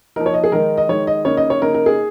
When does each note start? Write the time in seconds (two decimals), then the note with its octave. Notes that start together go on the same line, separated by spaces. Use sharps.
0.16 F3 A#3 D#4 A#4
0.26 C#5
0.34 D#5
0.44 G#4
0.52 D#3 G#3 D#4 A#4
0.77 D#5
0.89 D#3 G#3 D#4 C#5
1.07 D#5
1.25 C#3 A#3 D#4 C#5
1.37 D#5
1.50 C#5
1.62 C#3 A#3 D#4 A#4
1.74 A#4
1.86 G#4